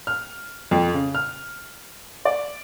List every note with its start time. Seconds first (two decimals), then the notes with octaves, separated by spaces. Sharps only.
0.07 F6
0.71 F2
0.94 C#3
1.15 F6
2.25 D5